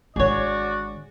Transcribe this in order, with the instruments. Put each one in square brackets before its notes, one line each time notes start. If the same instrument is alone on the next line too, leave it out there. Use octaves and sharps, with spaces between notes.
[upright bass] G#1 D3 [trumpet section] F#4 D5 [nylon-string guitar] G#4 C#5